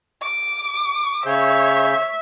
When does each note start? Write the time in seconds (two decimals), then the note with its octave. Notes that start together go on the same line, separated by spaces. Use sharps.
0.22 D6
1.26 C#3 G#4 C#5 E5 G6